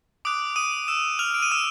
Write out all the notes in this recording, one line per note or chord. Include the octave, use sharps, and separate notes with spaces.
D6 D#6 F#6 D7
D#6 D#7
E6 E7
F6 F7
D7
D#7
E6 E7